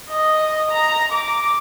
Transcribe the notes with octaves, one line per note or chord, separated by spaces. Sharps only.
D#5
A#5
D6